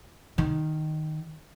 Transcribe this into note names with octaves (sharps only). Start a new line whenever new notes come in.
D#3